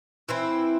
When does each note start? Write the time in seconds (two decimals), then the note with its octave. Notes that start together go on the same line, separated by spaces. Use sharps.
0.29 E3 C4 E4